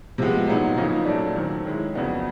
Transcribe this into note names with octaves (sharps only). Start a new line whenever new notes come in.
C3 F3 G#3 B3
A#2 F#3 B3 D#4
C#3 F3 A#3 D#4
A#2 F#3 A3 D4
D#3 F#3 A3 C4
D#3 G#3 C#4 E4
F2 C#3 F#3 B3 D4